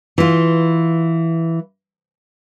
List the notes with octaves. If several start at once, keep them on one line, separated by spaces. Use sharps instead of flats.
E3 F4